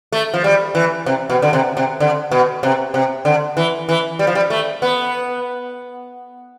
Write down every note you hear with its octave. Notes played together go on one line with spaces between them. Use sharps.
A3
F3
G3
E3
C3
B2
D3
C3
C3
D3
B2
C3
C3
D3
E3
E3
G3
F3
G3
A3
B3